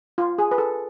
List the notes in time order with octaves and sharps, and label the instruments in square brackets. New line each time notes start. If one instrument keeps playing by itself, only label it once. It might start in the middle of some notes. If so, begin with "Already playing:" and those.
[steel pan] F4
G#4
B4
A4